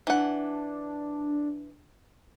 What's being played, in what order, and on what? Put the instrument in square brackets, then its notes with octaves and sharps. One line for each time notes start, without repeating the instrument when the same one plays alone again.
[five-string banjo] E3 F#5 [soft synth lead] D4